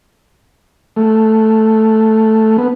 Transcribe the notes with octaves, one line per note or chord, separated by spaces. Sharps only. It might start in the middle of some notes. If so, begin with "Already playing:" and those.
A3
B3